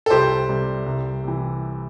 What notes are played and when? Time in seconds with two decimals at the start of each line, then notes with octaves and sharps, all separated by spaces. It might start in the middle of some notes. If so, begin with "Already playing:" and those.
0.06 A4
0.10 C2 G4 C5
0.49 C3 G3
0.86 C2
1.24 C3 E3